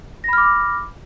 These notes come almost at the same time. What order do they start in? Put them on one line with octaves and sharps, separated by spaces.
A#6 B5 F6 D6